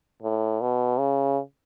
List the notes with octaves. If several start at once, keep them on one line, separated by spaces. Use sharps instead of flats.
A2
B2
C#3